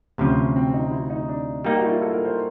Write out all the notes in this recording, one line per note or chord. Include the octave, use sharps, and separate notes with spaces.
D2 C3 F3 C#4
C4
D#4
E4
D#4
D4
G3 A#3 D#4 G4
F#4
E4
F4
A4
A#4
C5